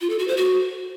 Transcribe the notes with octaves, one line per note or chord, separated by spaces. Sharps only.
F4
A4
F#4
C5
F#4